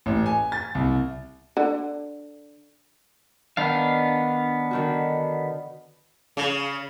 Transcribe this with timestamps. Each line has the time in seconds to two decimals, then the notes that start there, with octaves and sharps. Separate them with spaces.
0.06 A1
0.26 G#5
0.52 A6
0.75 C2
1.57 D3
3.57 D#3 B3 D4 F5
4.71 D3 D#3 F#4
6.37 C#3